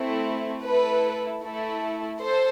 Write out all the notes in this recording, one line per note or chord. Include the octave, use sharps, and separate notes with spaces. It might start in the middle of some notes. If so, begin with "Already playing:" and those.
Already playing: A3 C4 E4
A3 E4 A4 B4
A3 E4 A4
A4 C5